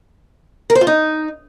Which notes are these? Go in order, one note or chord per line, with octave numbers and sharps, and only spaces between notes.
A#4
C5
F4
D#4